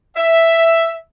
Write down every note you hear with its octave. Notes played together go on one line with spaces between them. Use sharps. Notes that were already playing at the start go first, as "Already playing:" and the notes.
E5